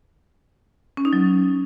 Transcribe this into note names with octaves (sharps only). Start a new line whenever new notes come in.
C#4
D#4
F#3